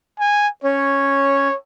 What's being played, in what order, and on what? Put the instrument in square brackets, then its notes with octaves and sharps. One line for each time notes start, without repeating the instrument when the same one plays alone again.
[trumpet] G#5
[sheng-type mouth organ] C#4 [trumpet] C#5